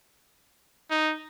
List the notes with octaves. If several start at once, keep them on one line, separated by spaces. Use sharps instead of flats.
D#4